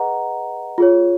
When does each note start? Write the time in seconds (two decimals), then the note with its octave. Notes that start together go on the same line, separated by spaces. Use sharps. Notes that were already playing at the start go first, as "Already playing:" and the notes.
Already playing: G#4 B4 D#5 F#5 A#5
0.78 F4 G#4 C#5